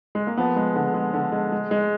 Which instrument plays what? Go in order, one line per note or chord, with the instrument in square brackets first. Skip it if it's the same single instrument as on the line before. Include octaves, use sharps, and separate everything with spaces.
[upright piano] G#3
A#3
F3 B3
G#3
D3
G#3
D3
G#3
G#3
G#3